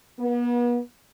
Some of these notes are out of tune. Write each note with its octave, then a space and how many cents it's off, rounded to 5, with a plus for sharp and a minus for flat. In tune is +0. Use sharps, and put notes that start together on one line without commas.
B3 -40